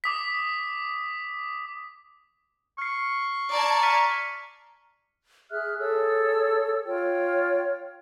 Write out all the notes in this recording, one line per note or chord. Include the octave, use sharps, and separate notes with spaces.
D6 D#6 B6
C#6 F6 C7
D5 A5 A#5 G#6
F6 B6 D#7
G#4 E5 F6 F#6
G#4 A4 C#5 E6
F4 C#5 G5